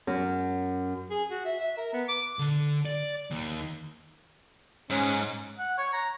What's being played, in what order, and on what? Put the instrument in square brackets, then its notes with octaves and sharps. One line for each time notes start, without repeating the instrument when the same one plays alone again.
[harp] F#2
[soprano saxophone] G#4
F#4
E5
E5
A#4
B3
D6
[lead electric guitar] D3
D5
D#2
[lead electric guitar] G#2 [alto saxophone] C#4
[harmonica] F#5
C#5
A#5